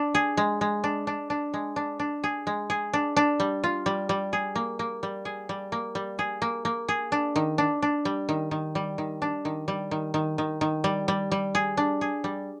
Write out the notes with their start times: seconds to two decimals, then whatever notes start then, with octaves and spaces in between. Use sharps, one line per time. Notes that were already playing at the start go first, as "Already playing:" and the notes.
Already playing: D4
0.15 G#4
0.37 G#3
0.61 G#3
0.84 D4
1.07 D4
1.30 D4
1.54 G#3
1.76 D4
2.00 D4
2.24 G#4
2.47 G#3
2.70 G#4
2.93 D4
3.16 D4
3.40 G3
3.64 F4
3.86 G3
4.09 G3
4.33 G#4
4.55 A#3
4.79 A#3
5.03 G3
5.25 G#4
5.49 G3
5.72 A#3
5.95 G3
6.19 G#4
6.42 A#3
6.65 A#3
6.88 G#4
7.12 D4
7.36 D#3
7.58 D4
7.82 D4
8.05 G3
8.29 D#3
8.51 D#3
8.75 G3
8.98 D#3
9.22 D4
9.45 D#3
9.68 G3
9.91 D#3
10.14 D#3
10.38 D#3
10.61 D#3
10.84 G3
11.08 G3
11.32 G3
11.55 G#4
11.77 D4
12.01 G#4
12.24 G3